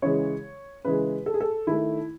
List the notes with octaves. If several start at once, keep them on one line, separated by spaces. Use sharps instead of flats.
C#3 E3 G#3 C#5
C#3 E3 G#3 B4
A4
G#4
A4
D#3 A3 E4